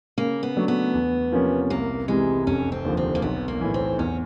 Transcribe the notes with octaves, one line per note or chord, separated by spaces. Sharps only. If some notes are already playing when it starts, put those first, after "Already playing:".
C#3 A#3
B3
F#3 A3 D4
B3
E2
C3 F3 A#3 C#4
C2 A#3
C3 E3 G3 G#3
F1 C#4
C4
D#2 D3 F3
C4
A#3
B1 B3
A#3
A2 E3
C4
E2 C#4